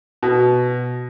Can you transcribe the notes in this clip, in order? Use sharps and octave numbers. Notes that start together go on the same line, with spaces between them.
B2